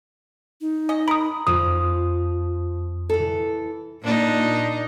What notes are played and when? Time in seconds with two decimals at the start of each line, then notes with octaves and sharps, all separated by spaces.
0.61 D#4
0.89 C#4 D#5
1.08 A#4 B5 D#6
1.47 F2 F3 D#6
3.09 E3 A4
4.02 A#2 D4 D#4